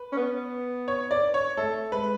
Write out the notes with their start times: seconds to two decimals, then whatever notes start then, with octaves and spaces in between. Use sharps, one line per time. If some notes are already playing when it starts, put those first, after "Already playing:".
Already playing: B4
0.12 C#4
0.17 B3
0.88 C#5
1.11 D5
1.34 C#5
1.57 A3 A4
1.92 G#3 B4